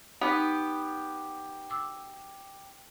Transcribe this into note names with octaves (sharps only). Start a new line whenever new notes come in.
B3 D#4 G4 D#6
D6 E6